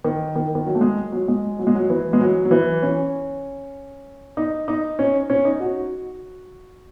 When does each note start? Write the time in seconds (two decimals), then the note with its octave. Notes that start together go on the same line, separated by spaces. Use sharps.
0.04 D#3
0.36 D#3
0.55 D#3
0.66 F#3
0.75 A3
0.81 G#3
1.12 F#3
1.28 G#3
1.59 F#3
1.67 G#3
1.75 F#3
1.90 E3
2.13 G#3
2.20 F#3
2.45 F#3
2.51 E3
2.82 C#4
4.37 D#4
4.68 D#4
4.99 C#4
5.30 C#4
5.45 D#4
5.60 F#4